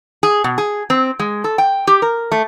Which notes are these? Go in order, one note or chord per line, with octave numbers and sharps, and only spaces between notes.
G#4
B2
G#4
C4
G#3
A4
G5
G4
A#4
A3